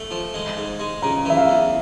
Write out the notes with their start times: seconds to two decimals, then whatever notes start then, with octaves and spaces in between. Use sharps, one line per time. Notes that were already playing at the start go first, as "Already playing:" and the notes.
Already playing: A3
0.11 F3
0.34 G#3
0.57 G#2
0.80 G#3
1.02 C#3 A#5
1.25 E3 E5
1.37 F5
1.48 E2